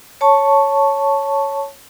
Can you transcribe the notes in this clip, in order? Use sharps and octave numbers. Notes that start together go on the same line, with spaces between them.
C#5 A5 C#6